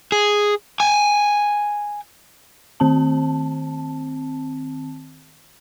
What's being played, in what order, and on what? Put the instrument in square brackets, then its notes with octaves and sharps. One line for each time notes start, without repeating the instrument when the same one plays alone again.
[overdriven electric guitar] G#4
G5 G#5
[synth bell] D#3 C4 A5